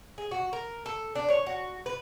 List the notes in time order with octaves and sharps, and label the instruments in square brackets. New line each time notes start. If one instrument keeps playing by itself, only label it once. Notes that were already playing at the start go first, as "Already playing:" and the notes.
[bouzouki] G#4
F#4
A#4
A4
D4
C#5
F#4
B4